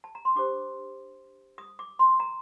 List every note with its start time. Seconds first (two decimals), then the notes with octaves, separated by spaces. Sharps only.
0.04 A5
0.15 A#5
0.25 C6
0.36 D4 G4 C5 D6
1.58 D#6
1.79 D6
1.99 C6
2.20 A#5